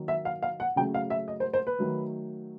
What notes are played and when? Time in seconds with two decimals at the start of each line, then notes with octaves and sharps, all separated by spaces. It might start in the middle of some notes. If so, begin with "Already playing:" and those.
Already playing: D#3 F#3 A#3
0.08 E5
0.25 F5
0.43 F5
0.60 F#5
0.76 C#3 F#3 A3 G5
0.94 F5
1.10 E5
1.28 D#5
1.40 C5
1.53 C5
1.67 B4
1.79 D#3 F#3 A3